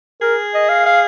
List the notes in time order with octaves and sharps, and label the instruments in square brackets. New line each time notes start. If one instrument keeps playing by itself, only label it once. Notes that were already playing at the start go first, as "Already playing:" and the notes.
[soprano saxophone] G#4 [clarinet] A#4
[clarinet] D#5
F5
F5